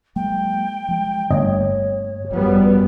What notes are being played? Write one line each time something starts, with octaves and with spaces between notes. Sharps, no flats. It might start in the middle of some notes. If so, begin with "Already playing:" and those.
F#3 G#3 A#3 G5
F3 G#3
G1 G2 A3 A#3 C#5 D#5
G#1 F#2 F3 G3 B3